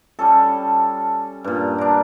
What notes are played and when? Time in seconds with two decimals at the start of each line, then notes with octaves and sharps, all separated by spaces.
0.19 G3 C#4 A4
1.44 G2 A#2
1.78 D4 A#4